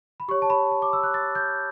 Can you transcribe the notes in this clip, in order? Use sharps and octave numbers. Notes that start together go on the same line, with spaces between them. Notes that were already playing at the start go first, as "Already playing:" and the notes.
B5
G4 C#5 C#6
A5
B5
B5
D6
E6
F#6
A6
G6